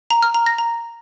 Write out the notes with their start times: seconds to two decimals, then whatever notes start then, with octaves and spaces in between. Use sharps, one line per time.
0.11 A#5
0.22 F6
0.34 A#5
0.46 A#6
0.58 A#5